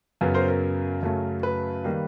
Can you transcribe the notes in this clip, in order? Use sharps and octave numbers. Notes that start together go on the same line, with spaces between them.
F#2 C#3 F#3 B3
A#4 C5
A#4
F#2 C#3 F#3 A3
B4
D#3 G3 A#3